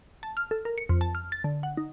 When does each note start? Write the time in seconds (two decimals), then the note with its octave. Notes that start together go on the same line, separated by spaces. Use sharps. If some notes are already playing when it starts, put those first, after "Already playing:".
0.23 A5
0.37 F6
0.51 A4
0.65 A#4
0.78 C#7
0.89 F2
1.01 A5
1.15 F6
1.32 A6
1.44 D3
1.63 F#5
1.77 D#4